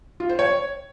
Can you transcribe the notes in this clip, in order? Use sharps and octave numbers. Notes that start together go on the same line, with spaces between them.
F4
C5
C#5